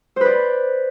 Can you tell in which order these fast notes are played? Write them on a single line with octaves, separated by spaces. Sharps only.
C5 B4 D5